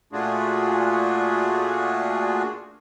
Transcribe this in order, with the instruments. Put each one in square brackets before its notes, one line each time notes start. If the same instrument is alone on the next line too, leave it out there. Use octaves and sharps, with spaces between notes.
[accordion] A#2 A3 D4 F4 F#4 G#4